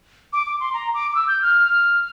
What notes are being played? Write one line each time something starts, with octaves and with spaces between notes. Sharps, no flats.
D6
D6
C6
A#5
D6
D6
E6
G6
F6